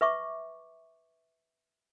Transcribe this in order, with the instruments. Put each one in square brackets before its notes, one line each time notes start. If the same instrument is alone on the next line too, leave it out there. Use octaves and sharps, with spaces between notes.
[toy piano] B4 E5 C#6 D6